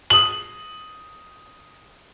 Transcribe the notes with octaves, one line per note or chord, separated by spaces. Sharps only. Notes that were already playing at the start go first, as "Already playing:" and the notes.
D#6 F#7